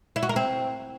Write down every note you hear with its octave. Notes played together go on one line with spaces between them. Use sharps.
E4
F#4
A#4
C4